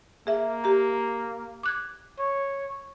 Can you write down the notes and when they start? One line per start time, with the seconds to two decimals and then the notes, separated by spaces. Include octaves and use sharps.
0.27 A#3 G#4 E5
0.64 G4 A#5
1.63 D6 F#6 G#6
2.19 C#5